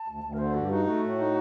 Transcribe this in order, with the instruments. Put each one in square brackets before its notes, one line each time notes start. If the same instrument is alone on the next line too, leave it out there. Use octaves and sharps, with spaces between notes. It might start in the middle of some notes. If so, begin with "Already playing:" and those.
Already playing: [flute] A5
[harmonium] D2
D2
[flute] A#4
[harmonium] D3 [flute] C5
[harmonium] G2 [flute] F#4
[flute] G4
[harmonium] D#4 [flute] F#4
[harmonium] A3 [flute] F#4
[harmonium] A2
D#4